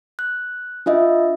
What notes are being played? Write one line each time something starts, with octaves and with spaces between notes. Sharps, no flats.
F#6
D4 F4 D#5 E5